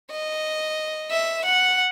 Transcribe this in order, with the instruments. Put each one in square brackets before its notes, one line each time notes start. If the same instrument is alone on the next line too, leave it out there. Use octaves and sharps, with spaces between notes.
[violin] D#5
E5
F#5